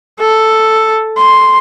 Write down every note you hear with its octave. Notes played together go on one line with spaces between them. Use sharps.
A4
C6